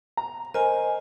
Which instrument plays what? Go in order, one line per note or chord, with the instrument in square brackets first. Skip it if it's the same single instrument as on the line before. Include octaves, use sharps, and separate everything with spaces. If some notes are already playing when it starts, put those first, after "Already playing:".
[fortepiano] A#5
[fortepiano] A#4 C5 [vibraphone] D#5 G#5